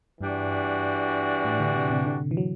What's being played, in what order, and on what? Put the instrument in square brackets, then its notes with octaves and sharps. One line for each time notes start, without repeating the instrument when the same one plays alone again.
[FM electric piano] G2 [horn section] E3 G3 D4 F#4
[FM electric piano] A2
D3
C3
C3
D3
E3
F#3